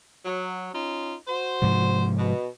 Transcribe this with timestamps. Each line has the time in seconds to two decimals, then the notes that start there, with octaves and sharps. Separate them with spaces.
0.25 F#3
0.72 C#4 D#4 F4
1.27 F#4 C5
1.62 G#2 C3 F3
2.17 B2